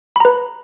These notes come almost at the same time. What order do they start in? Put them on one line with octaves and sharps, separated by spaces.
B5 A#5 B4